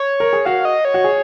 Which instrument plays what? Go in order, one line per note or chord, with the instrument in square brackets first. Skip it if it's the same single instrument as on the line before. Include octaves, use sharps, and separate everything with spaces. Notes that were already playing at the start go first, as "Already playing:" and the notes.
Already playing: [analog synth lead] C#5
[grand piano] A#4
G#4
[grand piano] F#4 [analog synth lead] F5
[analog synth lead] D#5
C#5
[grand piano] F#4
G#4